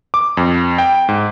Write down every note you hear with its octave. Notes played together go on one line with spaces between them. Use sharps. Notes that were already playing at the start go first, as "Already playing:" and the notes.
D6
F2
G5
G#2